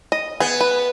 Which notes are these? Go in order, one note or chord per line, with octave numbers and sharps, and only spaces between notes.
D#5
B3 G#4
B4